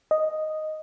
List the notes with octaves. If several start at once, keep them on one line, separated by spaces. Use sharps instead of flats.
D#5